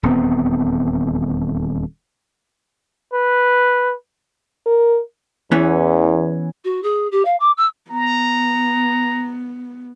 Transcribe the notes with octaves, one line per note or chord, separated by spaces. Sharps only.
D#1 E2 B3 C4
B4
A#4
E2 E3 B3 C#4
F#4
G#4
G4
F5
D6
E6
B3 A#5